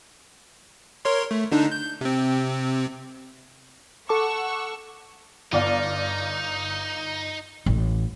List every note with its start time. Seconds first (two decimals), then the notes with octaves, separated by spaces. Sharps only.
1.05 A#4 C#5 C6
1.31 A3
1.52 D3 D4 D#4
1.72 G6
2.01 C3 C4
4.09 A4 F#5 A5 C#6 D6 E6
5.52 G1 D#4 D5 F5
7.66 A1